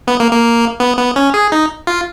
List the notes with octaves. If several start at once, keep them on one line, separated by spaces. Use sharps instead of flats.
B3
A#3
A#3
B3
B3
C#4
G#4
D#4
F4